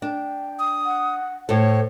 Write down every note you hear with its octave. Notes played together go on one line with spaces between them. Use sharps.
D4 G5
D#6
F#5
A2 A4 C5 C#5